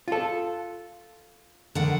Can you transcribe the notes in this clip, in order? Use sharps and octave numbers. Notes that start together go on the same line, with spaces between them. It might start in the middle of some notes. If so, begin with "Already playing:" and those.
F4 A4
D3 D#3 F#5